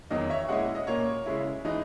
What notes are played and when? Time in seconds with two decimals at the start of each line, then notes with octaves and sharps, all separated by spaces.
0.10 E2 D#3 F#3 D#5
0.30 C#5 E5
0.49 A#2 G#3 C#4 E4 D#5 F#5
0.75 D#5
0.87 A#2 A#3 C#4 C#5
1.26 C#3 G#3 C#4 E4
1.65 E3 G#3 D#4